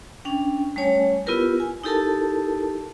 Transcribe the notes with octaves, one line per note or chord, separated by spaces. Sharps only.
C#4 D4 G5
G3 A3 C#4 C#5 G#5
B3 E4 F4 G4 A#4 B4
G#5
D#4 E4 G4 A4 A#4 A5